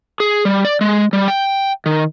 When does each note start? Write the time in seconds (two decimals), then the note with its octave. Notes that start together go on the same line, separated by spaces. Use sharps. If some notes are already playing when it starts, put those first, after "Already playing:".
0.20 G#4
0.45 G3
0.65 D5
0.81 G#3
1.13 G3
1.28 G5
1.86 D#3